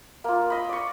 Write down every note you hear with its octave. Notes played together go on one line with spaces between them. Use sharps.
A#3 F4
D#5 B5
D5 C#6